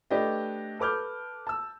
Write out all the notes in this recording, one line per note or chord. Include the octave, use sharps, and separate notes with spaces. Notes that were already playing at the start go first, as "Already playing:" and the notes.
A3 D4 G4 B4 D#5
A4 B4 D6 F6 G6
A5 E6